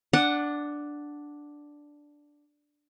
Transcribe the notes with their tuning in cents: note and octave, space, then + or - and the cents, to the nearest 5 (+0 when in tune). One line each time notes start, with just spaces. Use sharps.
D4 +0 F#5 +0 D6 +40